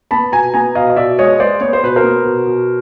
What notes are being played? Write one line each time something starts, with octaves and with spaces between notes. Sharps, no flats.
B3 A5 B5
B2 G#5 A#5
B3 G#5 A#5
B2 D#5 F5
D#5
B2 D5 E5
G#3 C#5 D#5
G#3 C5 D5
B3 C#5
C5
B2 B4
A#4 C5
B3
B2
B2